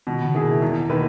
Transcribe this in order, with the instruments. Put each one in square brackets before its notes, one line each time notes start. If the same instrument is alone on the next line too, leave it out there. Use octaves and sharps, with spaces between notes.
[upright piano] B2 [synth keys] D#3
[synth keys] C#3
[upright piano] A#3 E4 G#4
[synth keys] B2
[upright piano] E2 [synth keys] B2
[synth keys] B2 [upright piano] D#3 A#3 E4 B4